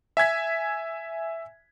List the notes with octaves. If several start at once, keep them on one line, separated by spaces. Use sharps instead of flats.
E5 G#5 G#6 B6